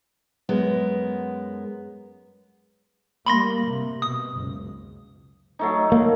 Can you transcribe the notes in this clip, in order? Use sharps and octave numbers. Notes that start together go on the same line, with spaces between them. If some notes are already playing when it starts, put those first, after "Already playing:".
F#2 G#3 B3 A#4
G3 A#3 B5 C6 A#6
C3
B2 D#6
F#1 C#2
F#3 A3 D#4
A#3